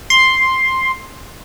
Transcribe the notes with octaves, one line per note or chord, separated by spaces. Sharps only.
C6